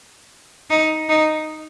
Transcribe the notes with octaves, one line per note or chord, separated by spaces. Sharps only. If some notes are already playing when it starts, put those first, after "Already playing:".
D#4
D#4